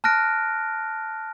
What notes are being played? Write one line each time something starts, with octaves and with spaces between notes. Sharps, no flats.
A5 F6 F#6 A#6 D7